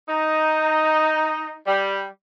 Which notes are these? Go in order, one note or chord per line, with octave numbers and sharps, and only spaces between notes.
D#4
G3